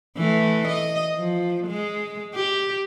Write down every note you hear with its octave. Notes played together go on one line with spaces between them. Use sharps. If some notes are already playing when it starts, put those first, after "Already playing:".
E3 A3
D#5
F3
G#3
G4